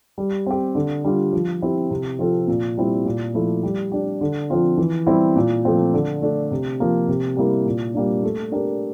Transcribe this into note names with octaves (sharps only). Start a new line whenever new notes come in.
G3
C4 G4
D3
G3 D4 F4
F3
C4 E4 G4
C3
F3 C4 F4 A4
A#2
G3 C4 E4
A#2
F3 A3 E4
G3
D4 G4
D3
F3 C4 F4
E3
G3 C4 E4 G4
A#2
F3 A3 C4
D3
A3 D4
C3
F3 A#3
C3
G3 A#3 E4 A#4
A#2
G3 A#3 D4
A3
D4 G4 A#4